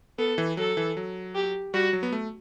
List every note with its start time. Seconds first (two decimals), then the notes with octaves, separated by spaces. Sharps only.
0.18 B3 A4
0.38 E3
0.57 F#3 A4
0.77 E3
0.97 F#3
1.34 G4
1.74 G3 F#4
1.93 F#3
2.03 B3
2.13 A3